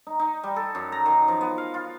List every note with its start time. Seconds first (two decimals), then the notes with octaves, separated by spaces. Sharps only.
0.07 D#4
0.19 D#4
0.43 G3
0.56 A4
0.75 F#2
0.92 A#5
1.06 D#3
1.28 F3
1.41 B3
1.58 F5
1.74 F4